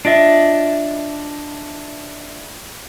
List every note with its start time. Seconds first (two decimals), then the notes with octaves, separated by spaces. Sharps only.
0.05 D4 F4 D#5 E5